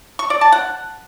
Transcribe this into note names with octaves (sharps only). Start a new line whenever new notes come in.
C#6
D5
A5
F#5